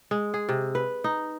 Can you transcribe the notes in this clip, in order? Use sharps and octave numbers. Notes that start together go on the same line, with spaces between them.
G#3
G#4
C3
B4
D#4